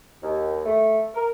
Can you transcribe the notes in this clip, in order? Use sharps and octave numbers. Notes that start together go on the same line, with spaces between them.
D#2
A3
A#4